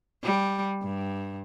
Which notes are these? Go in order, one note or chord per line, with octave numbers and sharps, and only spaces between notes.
G3
G2